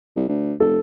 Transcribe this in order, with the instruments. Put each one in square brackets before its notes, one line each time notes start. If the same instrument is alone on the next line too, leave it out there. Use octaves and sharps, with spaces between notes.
[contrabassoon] C2
D2
[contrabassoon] F1 [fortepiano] A4